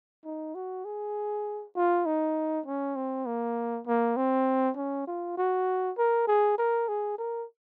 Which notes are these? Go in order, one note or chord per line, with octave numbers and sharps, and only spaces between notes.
D#4
F#4
G#4
F4
D#4
C#4
C4
A#3
A#3
C4
C#4
F4
F#4
A#4
G#4
A#4
G#4
A#4